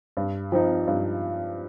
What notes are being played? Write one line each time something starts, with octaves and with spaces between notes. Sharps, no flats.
G2
F3 C4 D#4
G2